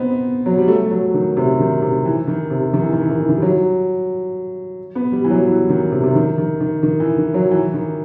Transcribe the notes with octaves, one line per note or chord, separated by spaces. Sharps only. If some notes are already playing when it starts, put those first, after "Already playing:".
Already playing: B3 C4 D#4
F#3
G3
A3
F#3
D#3
C3
D#3
C3
E3
D#3
C3
D#3
E3
D#3
E3
D#3
E3
D#3
G3
F#3
B3
G3
E3
F#3
E3
D#3
C3
C3
D#3
D#3
D#3
D#3
E3
D#3
F#3
E3
D#3